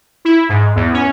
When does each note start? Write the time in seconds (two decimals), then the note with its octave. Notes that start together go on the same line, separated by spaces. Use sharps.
0.25 E4
0.49 G#2
0.76 E2
0.94 C#4